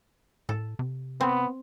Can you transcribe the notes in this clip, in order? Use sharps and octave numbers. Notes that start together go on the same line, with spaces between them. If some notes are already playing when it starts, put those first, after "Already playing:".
A2 A4
C3
B3 C4